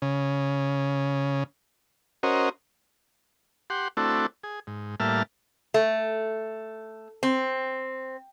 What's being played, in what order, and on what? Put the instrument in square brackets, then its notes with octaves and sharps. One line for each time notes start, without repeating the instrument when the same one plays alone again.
[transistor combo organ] C#3
C#4 F#4 A#4 C5 D#5
G4 F#5 C6
A3 C4 D4 E4 F#4 A4
G#4
G#2
A2 G3 A#3 E5 A5 F6
[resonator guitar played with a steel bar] A3
C4